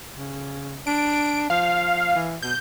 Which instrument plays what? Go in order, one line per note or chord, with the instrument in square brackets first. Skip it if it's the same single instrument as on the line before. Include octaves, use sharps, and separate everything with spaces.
[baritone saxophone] C#3
[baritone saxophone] D4 [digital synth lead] D7
[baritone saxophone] F3 [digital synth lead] F5
[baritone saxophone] E3
[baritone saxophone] B2 [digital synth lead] G6